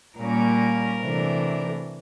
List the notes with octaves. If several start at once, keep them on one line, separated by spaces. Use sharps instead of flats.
A#2 G3 A#3 C#4 A#4
C3 E3 A3 D4